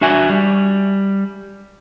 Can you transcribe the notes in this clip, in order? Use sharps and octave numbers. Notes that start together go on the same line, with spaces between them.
D4 F#4 E5 G#5
G3